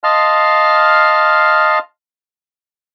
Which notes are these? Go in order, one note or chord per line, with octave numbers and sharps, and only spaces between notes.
D#5 F5 A5 C6 F6